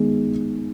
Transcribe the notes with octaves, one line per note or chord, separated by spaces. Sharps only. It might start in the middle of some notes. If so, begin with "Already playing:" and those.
Already playing: D#3 G#3 B3